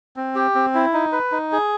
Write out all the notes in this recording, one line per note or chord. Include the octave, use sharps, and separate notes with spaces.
C4
G4
C4
E4
D#4
B4
D#4
G#4